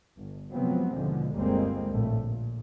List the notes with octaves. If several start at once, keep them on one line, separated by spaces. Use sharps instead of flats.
G1
C3 F3 F#3 G#3 B3 C4
D#2 B2 D3 F3 G#3
G1 D2 G3 G#3 A#3 C4
A#1 A2 A3
A#2